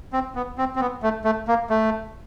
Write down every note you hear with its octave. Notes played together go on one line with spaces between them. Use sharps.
C4
B3
C4
C4
B3
A3
A3
A#3
A3